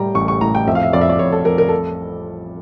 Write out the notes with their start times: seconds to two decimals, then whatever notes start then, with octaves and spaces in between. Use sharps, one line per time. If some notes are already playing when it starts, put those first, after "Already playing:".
Already playing: A2 G3 G5 A#5
0.15 A1 C#6
0.28 C#6
0.41 A2 A#5
0.55 G5
0.67 F2 E5
0.75 F5
0.83 E5
0.93 F2 D5
1.01 E5
1.09 D5
1.19 F2 C#5
1.32 A4
1.45 F2 A#4
1.58 A#4
1.69 A4